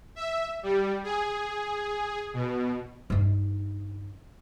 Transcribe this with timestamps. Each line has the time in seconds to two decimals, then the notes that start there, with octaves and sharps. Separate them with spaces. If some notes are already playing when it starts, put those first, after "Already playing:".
0.16 E5
0.63 G3
1.04 G#4
2.33 B2
3.10 G2 D#4